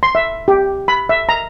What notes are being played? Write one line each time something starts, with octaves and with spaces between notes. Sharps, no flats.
C6
E5
G4
B5
E5
A#5